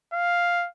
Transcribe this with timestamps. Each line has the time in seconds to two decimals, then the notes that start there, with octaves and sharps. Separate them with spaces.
0.13 F5